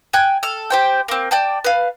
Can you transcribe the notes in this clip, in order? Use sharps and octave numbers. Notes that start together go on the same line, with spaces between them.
G5 G#5 F#6
A4 F6
G4 C5 G5
A#3 C4
D5 G5 A5
B4 F5